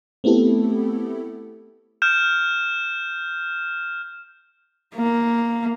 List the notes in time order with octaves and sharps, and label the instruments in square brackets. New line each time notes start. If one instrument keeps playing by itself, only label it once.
[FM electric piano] A3 B3 C4 E4 G4 A4
[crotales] F6 G6 E7
[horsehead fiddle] A#3